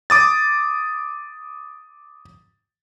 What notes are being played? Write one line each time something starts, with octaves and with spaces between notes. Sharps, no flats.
D6 D#6 A6